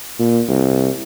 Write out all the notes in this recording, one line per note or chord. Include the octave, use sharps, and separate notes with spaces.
A#2
C2